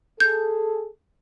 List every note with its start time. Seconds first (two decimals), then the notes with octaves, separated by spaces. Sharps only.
0.20 G#4 A4 G6